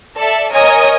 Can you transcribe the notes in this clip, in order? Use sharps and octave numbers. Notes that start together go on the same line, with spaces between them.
A4 D5 E5
A#4 C#5 D#5 G#5 D#6